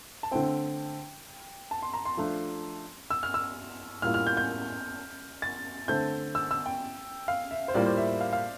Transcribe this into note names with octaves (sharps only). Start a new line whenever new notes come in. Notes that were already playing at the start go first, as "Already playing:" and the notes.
A5
D3 A3 C4 G5
A5
C6
A#5
C6
F3 A3 D4 F4
E6
F6
E6
A2 G3 A#3 F4 F6
F6
G6
G6
A6
D3 A3 C4 G6
E6
E6
G5
F5
E5
C5
A2 G3 A#3 F4 D5
C5
E5
E5
F5
F5